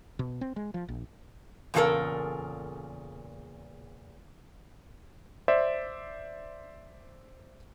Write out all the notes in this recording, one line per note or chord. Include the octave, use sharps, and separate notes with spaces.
B2
C4
G#3
F3
A#1
E2 A#2 C#3 G3 A4 A#4
C5 D5 E5